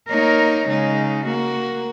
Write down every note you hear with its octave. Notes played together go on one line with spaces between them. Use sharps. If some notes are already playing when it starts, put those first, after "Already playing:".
A#3 D#4 A#4 C#5
C#3 G#3 D#4
A#3 F#4 A#4